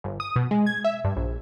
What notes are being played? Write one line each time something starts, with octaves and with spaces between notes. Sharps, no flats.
G1
D#6
B2
G#3
G#6
E5
G2
A#1